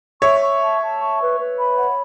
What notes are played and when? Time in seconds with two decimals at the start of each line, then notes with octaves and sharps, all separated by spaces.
0.22 C#5 E5 C#6
0.41 C#6
0.61 A5
0.80 A5
1.00 C#6
1.19 B4
1.39 B4
1.58 B5
1.77 F#5